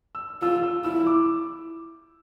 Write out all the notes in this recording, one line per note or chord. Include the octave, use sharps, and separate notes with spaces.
E6
F4 E6
E6
E4 E6
D6